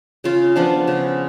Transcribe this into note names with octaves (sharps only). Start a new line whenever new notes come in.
C#3 F4
F3 B3 D4 F4
C#3